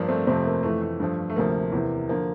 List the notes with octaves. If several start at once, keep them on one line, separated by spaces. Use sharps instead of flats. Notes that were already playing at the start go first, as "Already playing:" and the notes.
Already playing: G2 F3 A#3 D4
A3 C4
F2 C3 F3 A3 C4
A#3
F2 E3 A3
A3
G2 F3
A3
D2 C3 F3 A#3
E2 C3 E3
D3 F3 A#3